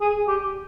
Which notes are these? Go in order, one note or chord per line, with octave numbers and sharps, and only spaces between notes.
G#4
G4